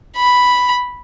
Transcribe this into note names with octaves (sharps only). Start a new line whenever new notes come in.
B5